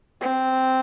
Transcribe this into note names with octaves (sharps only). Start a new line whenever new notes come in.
C4